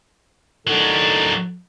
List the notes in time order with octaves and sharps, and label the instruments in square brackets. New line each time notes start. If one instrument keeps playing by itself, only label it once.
[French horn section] A2 D#3 A4 [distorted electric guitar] F#3 D4